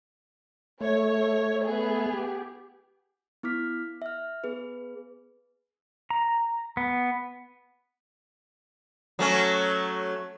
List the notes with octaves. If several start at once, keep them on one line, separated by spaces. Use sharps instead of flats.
A3 C#5
B3 G#4
G4
B3 E4 D6 F6 B6
E5 F6
B3 G#4 B4
A#5
B3
F#3 A3 C#4